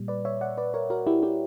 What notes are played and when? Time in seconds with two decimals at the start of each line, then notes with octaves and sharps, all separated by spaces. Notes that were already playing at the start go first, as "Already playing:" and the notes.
Already playing: A#2 G3
0.08 B4 D5
0.25 C#5 E5
0.41 D5 F#5
0.58 B4 D5
0.74 A#4 C#5
0.90 F#4 A#4
1.07 E4 G4
1.23 E4 G4